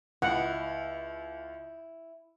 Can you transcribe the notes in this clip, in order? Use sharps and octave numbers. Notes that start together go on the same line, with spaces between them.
C#2 E4 F#5